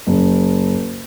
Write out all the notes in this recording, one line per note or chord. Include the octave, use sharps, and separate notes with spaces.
F#1